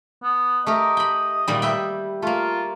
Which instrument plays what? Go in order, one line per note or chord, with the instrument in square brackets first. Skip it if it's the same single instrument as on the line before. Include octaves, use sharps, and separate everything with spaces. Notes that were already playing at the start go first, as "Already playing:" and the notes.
[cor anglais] B3
[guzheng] A3 G4 A#4 [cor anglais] D#5
[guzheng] G5 B5
A#2 D#3 G3
B4 E5 G5
[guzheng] A3 A#3 [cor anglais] F4